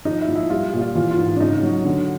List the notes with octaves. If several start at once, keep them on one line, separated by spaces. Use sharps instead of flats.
F3 D#4
E4
F3
E4
G3 F4
A#2
F4
E3 F4
F4
G#2
D4
C#3 D#4
F#3
D3